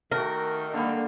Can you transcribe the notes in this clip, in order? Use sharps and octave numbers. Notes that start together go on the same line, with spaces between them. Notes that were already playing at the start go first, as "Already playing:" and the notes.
D#3 A3 F#4 A#4 G5
D3 G3 A#3